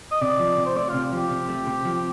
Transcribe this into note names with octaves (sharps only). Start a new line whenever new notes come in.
D#5
C3 D5
F3
C3
C5
A3 D5
C3 F4
F3
G4
C3
A3
C3
F3